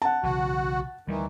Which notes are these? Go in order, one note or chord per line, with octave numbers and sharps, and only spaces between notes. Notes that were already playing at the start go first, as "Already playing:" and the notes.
F#5 A5
B1 C#3 E3 F#4
D2 D#3 E3 G3